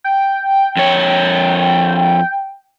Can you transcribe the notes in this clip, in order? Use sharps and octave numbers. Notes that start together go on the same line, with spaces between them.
G5
F2 C#5